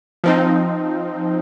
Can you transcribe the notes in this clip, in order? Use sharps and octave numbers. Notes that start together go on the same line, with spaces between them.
F3 C4 D#4